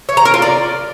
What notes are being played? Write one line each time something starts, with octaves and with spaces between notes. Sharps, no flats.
C#5
A#5
A#4
F4
D5